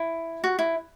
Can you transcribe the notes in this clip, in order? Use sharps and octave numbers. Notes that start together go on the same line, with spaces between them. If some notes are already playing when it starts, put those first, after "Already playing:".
Already playing: E4
F#4
E4